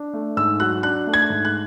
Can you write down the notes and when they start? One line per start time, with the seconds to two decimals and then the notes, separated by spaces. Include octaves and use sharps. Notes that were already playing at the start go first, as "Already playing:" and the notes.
Already playing: D4
0.14 A3
0.37 G#2 E6
0.60 F#3 F#6
0.83 D4 F#6
1.07 A3
1.13 G#6
1.30 G#2
1.45 F#6